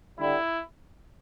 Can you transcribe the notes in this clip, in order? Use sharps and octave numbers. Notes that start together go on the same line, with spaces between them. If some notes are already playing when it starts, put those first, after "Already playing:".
D3 G3 E4